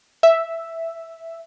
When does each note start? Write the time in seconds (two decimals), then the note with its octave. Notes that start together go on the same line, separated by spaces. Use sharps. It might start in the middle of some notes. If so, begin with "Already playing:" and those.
0.23 E5